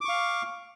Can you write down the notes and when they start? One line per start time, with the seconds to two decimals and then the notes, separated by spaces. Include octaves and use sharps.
0.01 D6
0.05 C#6
0.09 F5